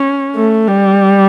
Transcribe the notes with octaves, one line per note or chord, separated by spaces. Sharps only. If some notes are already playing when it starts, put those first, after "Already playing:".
Already playing: C#4
A3
G3